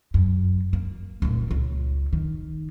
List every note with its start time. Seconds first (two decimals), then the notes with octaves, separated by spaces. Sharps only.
0.14 F#2
0.73 A#3
1.22 F1 A#2
1.51 C#2
2.13 D#3